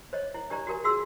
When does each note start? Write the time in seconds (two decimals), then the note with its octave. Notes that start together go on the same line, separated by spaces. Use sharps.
0.13 C5 C#5 D#5
0.34 E4
0.50 D4 G4 C5 D5 A#5
0.67 F#4 G4 A#4 G#5
0.84 F4 F#4 G#4 C6 E6